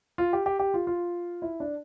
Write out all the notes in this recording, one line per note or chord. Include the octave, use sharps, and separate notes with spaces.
F4
G4
G4
G4
F4
F4
E4
D4